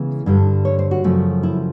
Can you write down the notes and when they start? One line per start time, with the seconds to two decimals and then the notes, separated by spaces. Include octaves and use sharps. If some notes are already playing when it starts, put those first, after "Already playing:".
Already playing: C#3 E3 G#3 B3
0.26 G2 D3 G3
0.65 C#5
0.79 C5
0.91 F#4
1.04 F#2 C#3 F3 A3
1.43 E4